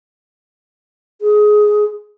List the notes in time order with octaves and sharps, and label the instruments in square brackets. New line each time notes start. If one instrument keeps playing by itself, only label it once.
[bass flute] G#4